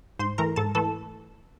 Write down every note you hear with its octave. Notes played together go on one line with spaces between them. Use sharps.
G#2 C5 C6
E3 A3 A#4 A#5
G#2 A4 A5
E3 A3 A4 A5